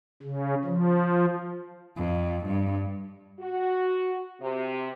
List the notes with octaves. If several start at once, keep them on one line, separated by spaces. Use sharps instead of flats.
C#3
F3
F2
G2
F#4
C3